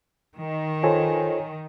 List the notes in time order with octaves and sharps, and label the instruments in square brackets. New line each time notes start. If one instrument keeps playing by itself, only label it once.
[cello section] D#3
[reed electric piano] F4 A4 C5 [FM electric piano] C#5 G#5